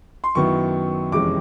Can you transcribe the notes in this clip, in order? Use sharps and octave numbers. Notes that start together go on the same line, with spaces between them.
C6
F#2 D#3 F#3 B3 E4 C#6
F2 C3 E3 G#3 C#4 D6